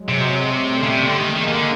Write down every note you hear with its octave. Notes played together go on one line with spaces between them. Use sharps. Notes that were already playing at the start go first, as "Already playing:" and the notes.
Already playing: F#3 G#3
C3
G3 A3
C#3
C3
D3
D#3 G#3 A#3
D#3
D#3
D3